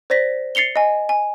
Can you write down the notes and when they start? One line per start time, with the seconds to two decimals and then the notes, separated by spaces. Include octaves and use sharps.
0.10 C5 D5 A#6 B6
0.55 A6 C7 C#7 F7 G7
0.76 D#5 G#5
1.09 G#5